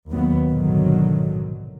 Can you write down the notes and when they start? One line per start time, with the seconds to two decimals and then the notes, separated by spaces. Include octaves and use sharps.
0.11 D#2 F#3 B3
0.49 A#1 G#2 B2 D3 D#3 F#3